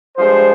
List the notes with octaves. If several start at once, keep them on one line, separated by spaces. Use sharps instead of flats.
G2 F3 G#3 C5